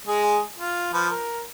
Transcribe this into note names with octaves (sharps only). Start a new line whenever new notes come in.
G#3 G#4
F4
F3 B4
A#4